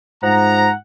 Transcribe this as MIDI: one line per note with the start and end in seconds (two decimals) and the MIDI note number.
0.23 0.72 44
0.23 0.68 53
0.23 0.74 78
0.23 0.70 82